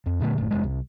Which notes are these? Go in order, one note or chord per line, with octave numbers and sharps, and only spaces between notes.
F2
A#2 D3 F3 A3
F#1 A2
F1 G#3
C2